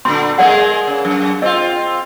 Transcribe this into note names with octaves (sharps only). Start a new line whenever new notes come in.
A#2 D3 C6
G#3 A#3 G#4 D5 F#5
C#3
F#2
C4 F4 D#5